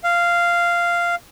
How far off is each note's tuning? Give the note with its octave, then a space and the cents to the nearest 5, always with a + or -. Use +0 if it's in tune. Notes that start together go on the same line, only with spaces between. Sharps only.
F5 -10